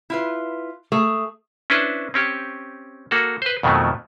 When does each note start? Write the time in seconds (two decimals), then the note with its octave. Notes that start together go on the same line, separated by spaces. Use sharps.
0.10 E4 F4 B4
0.92 A3 G#4
1.70 C#4 D4 E4 B4 C5
2.14 C4 C#4 G4
3.11 A#3 F#4 A4
3.42 B4 C5
3.63 F2 B2 D#3 F3 F#3 A3